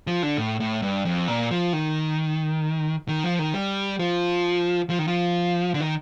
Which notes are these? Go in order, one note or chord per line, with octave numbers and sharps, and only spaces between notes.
F3
D3
A2
A2
G2
F2
A#2
F3
D#3
D#3
F3
D#3
G3
F3
F3
D#3
F3
D3
D#3